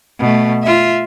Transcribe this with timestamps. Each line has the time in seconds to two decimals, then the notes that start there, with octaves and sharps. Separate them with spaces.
0.19 B2 A3
0.63 F4 E5